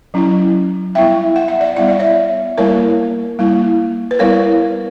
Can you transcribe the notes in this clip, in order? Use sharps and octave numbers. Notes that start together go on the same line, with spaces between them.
F#3 C#4 E4
G3 B3 E4 E5 G5
F#5
E5
D5 F#5
G3 B3 E4 E5
D5
C#5 E5
G3 A#3 E4 A#4 C#5
G3 A#3 E4
B4
G3 B3 E4 A#4 C#5